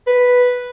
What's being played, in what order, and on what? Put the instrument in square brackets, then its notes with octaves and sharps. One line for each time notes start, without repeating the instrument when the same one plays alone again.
[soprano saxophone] B4